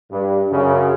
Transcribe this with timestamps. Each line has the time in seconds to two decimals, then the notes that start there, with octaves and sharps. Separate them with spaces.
0.11 G2
0.51 F#2 C#3